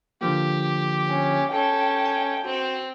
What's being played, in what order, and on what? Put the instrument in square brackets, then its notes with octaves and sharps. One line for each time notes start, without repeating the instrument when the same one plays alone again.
[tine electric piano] D3 F3 A#3 [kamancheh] G4
[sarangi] C#4
[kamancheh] C#4 A4 [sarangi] G5
[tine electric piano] G#5
[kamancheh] C4 [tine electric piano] F#4